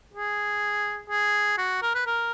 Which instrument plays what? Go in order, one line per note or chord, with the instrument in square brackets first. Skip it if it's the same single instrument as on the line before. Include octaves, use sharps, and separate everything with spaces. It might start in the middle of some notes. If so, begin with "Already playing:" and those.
[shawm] G#4
G#4
F#4
A#4
B4
A#4